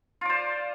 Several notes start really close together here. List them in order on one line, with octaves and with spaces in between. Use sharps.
F4 D5 C5